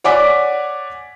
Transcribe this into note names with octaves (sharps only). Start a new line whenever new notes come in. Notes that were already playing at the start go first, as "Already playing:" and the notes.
C#5 D5 F#5 G#5 D6 B6